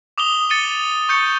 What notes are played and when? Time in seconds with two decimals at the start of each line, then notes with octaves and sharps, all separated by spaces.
0.18 D6 D#6 F7 G7
0.50 A6 C#7 D#7 G7
1.09 C#6 G6 C#7